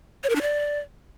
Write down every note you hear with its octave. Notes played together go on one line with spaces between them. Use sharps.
C#5
A#4
D4
D5